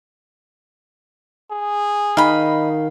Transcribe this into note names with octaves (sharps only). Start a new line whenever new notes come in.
G#4
D#3 A#4 D#5 F5 B5